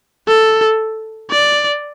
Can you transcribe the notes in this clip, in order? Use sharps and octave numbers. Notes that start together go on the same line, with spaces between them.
A4
D5